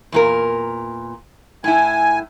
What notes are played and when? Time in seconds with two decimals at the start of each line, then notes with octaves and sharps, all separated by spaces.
0.12 E2 A#2 A#4
1.64 A2 E4 G#5